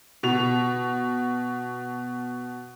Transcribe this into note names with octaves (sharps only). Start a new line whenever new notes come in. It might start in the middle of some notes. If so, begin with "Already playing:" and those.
B2 F7